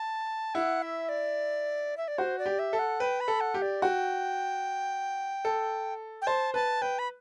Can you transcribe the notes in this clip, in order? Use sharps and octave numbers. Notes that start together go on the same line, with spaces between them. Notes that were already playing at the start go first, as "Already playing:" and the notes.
Already playing: A5
E4 F#5
E5
D5
E5
D5
F#4 C5
D5
G4
E5
A4
F#5
B4 G5
B5
A4
F#5
G4
D5
F#4 G5
A4
G5
C5 A5
B4 A5
B4 G5
B5